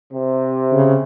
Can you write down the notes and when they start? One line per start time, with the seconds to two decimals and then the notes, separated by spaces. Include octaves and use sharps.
0.12 C3
0.72 C#3